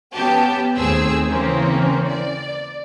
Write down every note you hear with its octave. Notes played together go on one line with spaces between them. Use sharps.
B3 C#4 G4 A5
D#2 A3 C4 G#4 E6
C#3 E3 A#3 C4 C#4
D5